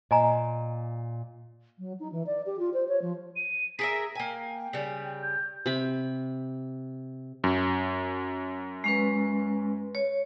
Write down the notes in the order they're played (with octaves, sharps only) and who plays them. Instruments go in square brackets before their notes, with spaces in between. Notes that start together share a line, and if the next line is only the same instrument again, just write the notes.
[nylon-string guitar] A#2 [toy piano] D#5 G#5 A#5
[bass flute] F#3
D#4
E3
D5
G4
F4
C5
C#5
F3
[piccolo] D#7
[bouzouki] G#4 A#4 E5 [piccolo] B6
[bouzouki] A#3 G#5 [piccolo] G5
[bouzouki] C#3 G3
[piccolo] G6
[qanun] C3 B5
[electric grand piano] F#2
[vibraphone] G#3 C#4 B4
C#5